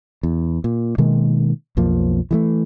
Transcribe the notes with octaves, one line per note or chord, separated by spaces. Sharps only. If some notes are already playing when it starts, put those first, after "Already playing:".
E2
A#2
B2 D#3 G#3 A#3
B1 F2 F3 A#3
E3 G#3 A3